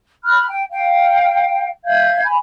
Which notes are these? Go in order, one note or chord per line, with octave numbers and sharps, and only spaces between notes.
B5 F6 F#6
G5
F5 G5
E5 F5 G6 G#6
G#5 B5